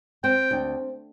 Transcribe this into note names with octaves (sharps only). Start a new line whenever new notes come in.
C4 G5
D2